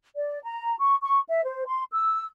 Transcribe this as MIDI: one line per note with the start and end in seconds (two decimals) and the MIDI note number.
0.16 0.39 74
0.43 0.75 82
0.80 0.96 85
1.02 1.19 85
1.29 1.44 76
1.44 1.65 72
1.66 1.84 84
1.92 2.24 88